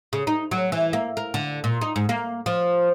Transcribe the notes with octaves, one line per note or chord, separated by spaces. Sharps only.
C#3
D#4
F#3
E3
A#3
A#4
D3
A#2
D#4
G#2
A#3
F3